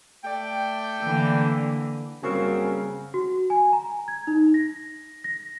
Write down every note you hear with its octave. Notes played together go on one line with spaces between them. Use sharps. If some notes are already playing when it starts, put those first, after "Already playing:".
A3 D5 G5
D3 E3 A#3
F#2 C#3 G3 A#3 C4 F#4 G#4 A#4
F#4
G#5
A#5
G#6
D#4
A#6
A#6